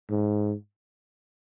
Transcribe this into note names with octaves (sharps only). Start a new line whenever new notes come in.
G#2